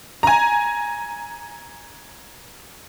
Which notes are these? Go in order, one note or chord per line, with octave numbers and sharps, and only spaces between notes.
G#5 A#5